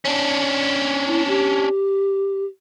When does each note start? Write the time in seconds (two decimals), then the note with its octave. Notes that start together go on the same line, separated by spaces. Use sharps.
0.05 C#4 D4
1.07 E4
1.28 G4